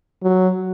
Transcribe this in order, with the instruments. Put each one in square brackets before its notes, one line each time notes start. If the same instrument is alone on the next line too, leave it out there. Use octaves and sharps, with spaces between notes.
[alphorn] F#3